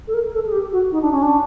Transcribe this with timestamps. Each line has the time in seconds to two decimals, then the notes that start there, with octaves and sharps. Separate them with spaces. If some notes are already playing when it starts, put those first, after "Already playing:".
0.07 A4
0.14 A#4
0.34 A4
0.46 G#4
0.52 G4
0.72 F#4
0.92 D#4
1.01 D4
1.11 C#4
1.22 D4